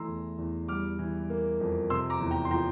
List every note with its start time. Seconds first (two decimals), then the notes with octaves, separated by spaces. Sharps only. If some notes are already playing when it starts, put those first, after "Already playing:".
Already playing: E3 A3 A#5 C6 E6
0.08 E2
0.38 E2
0.68 G3 D6 F6
0.99 E3
1.30 A#3
1.60 F2
1.90 C3 C6 E6
2.10 A#5 D6
2.20 E2
2.31 G5 A#5
2.45 C6
2.51 F3 G5 A#5